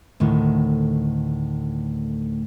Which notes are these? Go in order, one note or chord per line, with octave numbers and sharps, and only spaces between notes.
D2 A2 D#3